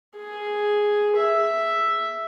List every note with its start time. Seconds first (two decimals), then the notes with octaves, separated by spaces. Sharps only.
0.16 G#4
1.16 E5